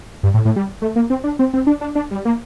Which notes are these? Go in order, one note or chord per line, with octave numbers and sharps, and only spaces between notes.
G2
A2
A2
G3
A3
A#3
C4
D4
C4
C4
D4
D4
D4
G3
A#3